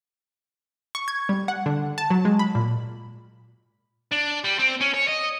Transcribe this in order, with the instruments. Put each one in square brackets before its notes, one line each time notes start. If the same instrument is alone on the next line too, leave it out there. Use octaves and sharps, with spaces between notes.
[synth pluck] C#6
G#6
G3
F#5
D3
A5
F#3
G#3
B5
A#2
[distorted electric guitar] D4
G3
C4
C#4
C#5
D#5